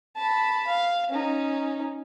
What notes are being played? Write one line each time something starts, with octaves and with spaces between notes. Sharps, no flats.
A5 B5
F5
C#4 D#4